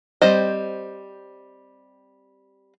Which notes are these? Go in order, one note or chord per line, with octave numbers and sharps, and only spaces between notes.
G3 C4 C5 D#5